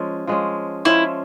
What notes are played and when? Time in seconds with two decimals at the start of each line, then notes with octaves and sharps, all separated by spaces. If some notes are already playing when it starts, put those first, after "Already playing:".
Already playing: F3 G#3 C#4
0.27 F3 G#3 C#4
0.85 F3 G#3 C#4 E4